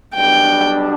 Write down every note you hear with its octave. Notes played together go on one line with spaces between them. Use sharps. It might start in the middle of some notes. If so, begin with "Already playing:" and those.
B1 B2 G3 D4 G5